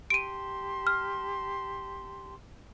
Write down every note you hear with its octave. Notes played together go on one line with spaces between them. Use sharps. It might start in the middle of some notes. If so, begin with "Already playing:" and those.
G4 A5 C6 D7 D#7
F6